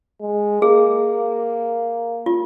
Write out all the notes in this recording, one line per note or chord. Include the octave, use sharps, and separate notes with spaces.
G#3
A#3 G#4
F4